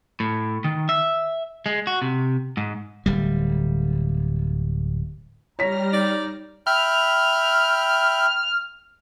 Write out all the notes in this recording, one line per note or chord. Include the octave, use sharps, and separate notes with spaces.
A2
D#3
E5
G#3
F#4
C3
G#2
D1 G3
G3 C#5 A#5 F6 A#6 B6
D#4 D5
E5 G5 B5 F6